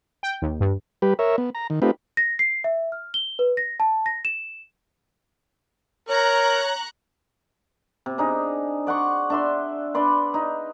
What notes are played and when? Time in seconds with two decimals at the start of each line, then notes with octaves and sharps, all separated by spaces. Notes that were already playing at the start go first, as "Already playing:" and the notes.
0.23 G5
0.42 D#2
0.60 G2
1.02 G3 G4 B4
1.19 A#4 C#5 E5
1.38 B3
1.55 A#5
1.70 D#3
1.82 A3 C4 D#4 F4 G4 B4
2.17 A#6
2.39 C7
2.64 E5
2.92 F6
3.14 G7
3.39 B4
3.57 A#6
3.80 A5
4.06 A#6
4.25 E7
6.09 A#4 C#5 A#5 C#6 F#6
8.06 C3
8.18 D4 D#4 G#4
8.87 D5 F#5 C6 C#6
9.30 D4 E5 C6
9.94 D4 B4 D5 C6
10.34 D#4